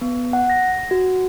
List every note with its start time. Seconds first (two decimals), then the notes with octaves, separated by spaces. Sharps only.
0.01 B3
0.33 F#5
0.50 A#6
0.91 F#4